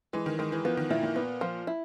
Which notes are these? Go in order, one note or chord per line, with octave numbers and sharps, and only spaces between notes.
E3 G#3
D#3
D#3 G#3
E3
F3 B3
D#3
A#2 E4
A#2
B3
F3
E4